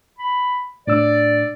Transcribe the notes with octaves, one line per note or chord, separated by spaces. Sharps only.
B5
A2 D4 D5 E6